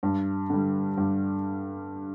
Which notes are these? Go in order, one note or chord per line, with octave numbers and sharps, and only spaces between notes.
G2
D3 G3
G2